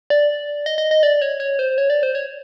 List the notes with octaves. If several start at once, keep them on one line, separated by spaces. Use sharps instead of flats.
D5
D#5
D#5
D#5
D5
C#5
C#5
C5
C#5
D5
C5
C#5